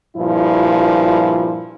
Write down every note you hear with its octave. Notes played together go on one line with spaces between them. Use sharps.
G2 A#2 F3 E4